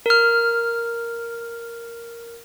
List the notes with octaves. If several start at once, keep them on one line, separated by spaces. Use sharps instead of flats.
A#4 F6